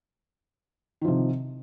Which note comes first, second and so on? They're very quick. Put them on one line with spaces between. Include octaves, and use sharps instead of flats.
D#3 F3 C3